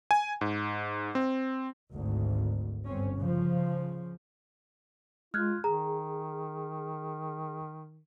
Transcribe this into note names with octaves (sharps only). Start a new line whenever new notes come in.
G#5
G#2
C4
G#1 D2
G1 C4 C#4
C#3 F3
G#3 F4 F6 F#6 G#6
D#3 G#4 A#5